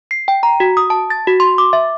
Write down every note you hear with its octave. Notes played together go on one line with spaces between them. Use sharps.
C7
G5
A#5
F#4
D#6
A5
A6
F#4
C6
D6
E5